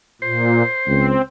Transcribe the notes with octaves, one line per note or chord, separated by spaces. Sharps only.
A#2 C5
C#2 C4